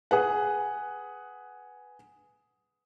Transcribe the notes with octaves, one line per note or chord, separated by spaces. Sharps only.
G#4 B4 F#5